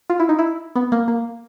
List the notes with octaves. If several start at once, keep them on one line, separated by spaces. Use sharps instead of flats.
F4
E4
D#4
E4
B3
A#3
A#3